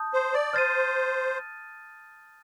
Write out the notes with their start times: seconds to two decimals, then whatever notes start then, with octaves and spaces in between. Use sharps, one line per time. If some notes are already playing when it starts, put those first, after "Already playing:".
Already playing: A5 D#6 G6
0.14 C5
0.34 D5
0.53 C5 F6 A6 D#7